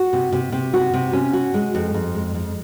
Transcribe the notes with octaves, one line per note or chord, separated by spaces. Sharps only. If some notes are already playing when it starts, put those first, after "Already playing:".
Already playing: F#4
C3
C3
C3
F#4
C3
C#4
F#4
G#3
F2
F2
G#3
F2